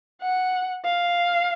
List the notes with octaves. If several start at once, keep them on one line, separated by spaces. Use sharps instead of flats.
F#5
F5